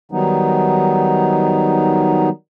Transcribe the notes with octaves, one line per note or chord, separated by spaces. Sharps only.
D#3 F#3 G3 B3 D#4